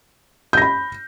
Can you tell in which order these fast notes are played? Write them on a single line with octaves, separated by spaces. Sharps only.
G6 A#6 B5